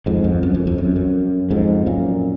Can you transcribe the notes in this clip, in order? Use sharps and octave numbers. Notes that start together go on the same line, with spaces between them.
F2 G#2
F2
F#2
F2
F2
F#2
F#2
F2 G#2
F#2 A#2